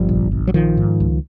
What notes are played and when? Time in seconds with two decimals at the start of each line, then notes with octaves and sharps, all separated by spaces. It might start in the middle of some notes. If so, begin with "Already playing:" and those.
Already playing: G1 F3 G3
0.09 A#1
0.32 A#1
0.47 F#3
0.54 A#1 D#3 F3
0.77 G#2
1.00 C#2